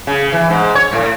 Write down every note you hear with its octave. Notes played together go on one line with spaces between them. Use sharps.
C#3
E3
G#2
C#5
A2